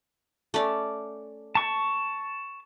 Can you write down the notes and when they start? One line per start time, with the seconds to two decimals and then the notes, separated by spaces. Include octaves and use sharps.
0.54 A3 C#4 D5
1.55 A5 C#6